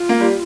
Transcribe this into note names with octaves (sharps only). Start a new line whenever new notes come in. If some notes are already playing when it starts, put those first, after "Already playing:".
Already playing: F4
A#3
G3